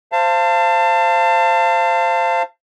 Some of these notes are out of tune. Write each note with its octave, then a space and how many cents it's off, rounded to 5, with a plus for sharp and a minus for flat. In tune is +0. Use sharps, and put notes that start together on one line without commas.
C5 +0 F5 -25 A5 +25